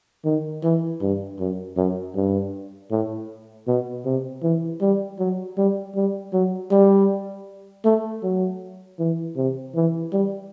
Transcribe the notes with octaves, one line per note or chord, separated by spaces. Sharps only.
D#3
E3
G2
F#2
F#2
G2
A2
B2
C3
E3
G3
F#3
G3
G3
F#3
G3
A3
F#3
E3
C3
E3
G3